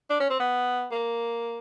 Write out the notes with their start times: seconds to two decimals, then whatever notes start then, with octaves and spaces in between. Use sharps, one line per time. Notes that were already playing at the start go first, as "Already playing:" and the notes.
0.10 D4
0.20 C#4
0.30 C4
0.40 B3
0.92 A#3